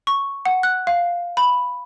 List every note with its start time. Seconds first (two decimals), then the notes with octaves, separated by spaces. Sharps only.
0.07 C#6
0.46 F#5
0.63 F#6
0.87 F5
1.37 B5